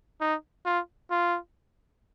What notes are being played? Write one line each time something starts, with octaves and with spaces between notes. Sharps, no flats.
D#4
F4
F4